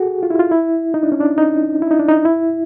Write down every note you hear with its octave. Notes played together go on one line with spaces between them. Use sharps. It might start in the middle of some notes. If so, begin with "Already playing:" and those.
Already playing: F#4 G#4 A4
F4
E4
F4
E4
D#4
D4
C#4
D4
D#4
E4
D#4
D4
D#4
E4